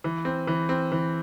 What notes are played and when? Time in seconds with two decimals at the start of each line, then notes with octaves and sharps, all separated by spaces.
0.04 E3
0.25 C4
0.47 E3
0.69 C4
0.92 E3